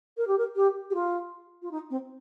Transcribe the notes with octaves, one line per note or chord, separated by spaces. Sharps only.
A#4
G4
A#4
G4
G4
F4
F4
D#4
C4